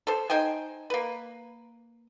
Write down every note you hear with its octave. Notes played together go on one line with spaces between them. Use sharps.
A4 C5
D#4 C5 G5 G#5
A#3 B4